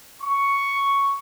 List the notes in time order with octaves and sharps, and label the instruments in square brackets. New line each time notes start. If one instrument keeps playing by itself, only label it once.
[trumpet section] C#6